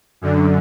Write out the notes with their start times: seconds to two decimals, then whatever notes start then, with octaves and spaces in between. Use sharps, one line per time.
0.21 F#2 D3